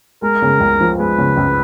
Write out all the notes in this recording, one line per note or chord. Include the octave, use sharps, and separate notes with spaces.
G#3 A#4
C#3
C#2
F3
G#3 B4
C#3
C#2